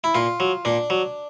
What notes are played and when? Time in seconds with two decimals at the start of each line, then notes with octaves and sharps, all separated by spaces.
0.04 E4
0.15 A#2 F4
0.40 F#3
0.65 A#2 D4
0.90 F#3